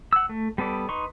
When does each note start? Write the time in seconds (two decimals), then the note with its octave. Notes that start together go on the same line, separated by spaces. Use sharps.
0.13 F#5 E6
0.29 A3
0.58 G3 B3 A4 D5
0.89 D#4 B4 C6 C#6